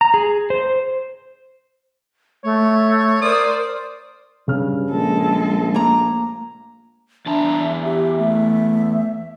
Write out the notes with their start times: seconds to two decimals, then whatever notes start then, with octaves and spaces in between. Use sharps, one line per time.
0.01 A#5
0.14 G#4
0.50 C5
2.44 A3 C#5
3.22 A#4 C5 D5 D#6
4.48 G2 C#3 F6
4.90 A#1 G#3 A4
5.74 A#3 A#5
7.26 E2 D4 E5 A5 A#5
7.84 G4
8.18 A3